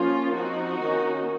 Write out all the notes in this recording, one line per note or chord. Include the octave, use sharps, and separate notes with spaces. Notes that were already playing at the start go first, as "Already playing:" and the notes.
Already playing: F3 A#3 C#4 F4
F3 C4 D#4 F#4
D#3 A#3 C#4